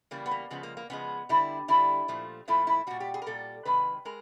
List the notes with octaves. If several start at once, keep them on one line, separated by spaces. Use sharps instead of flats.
C#3 E3 G3 A#3
B3
A#3
C#3 F3 G#3 B3
A#3
A#3
C#3 F3 G#3 B3
D3 G3 E4
D3 G3 E4
A#2 F3 A3
A#2 F3 A3 E4
E4
A#2 G3 F#4
G4
G#4
A#4
A#2 G3 A4
C3 D#3 G#3 B4
G#3 A#4